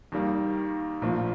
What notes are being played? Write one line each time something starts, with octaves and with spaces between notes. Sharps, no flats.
D#2 D#3 G3 A#3
A#1 A2 F3 A#3